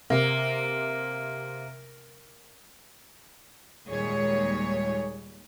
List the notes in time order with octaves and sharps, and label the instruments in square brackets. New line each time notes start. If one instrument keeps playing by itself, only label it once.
[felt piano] C3 [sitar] A#3
[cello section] D#2 A#2 G3 G#3 G#4 C#5